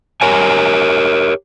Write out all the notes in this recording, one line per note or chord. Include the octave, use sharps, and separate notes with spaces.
G4 A#4 C#5 G#5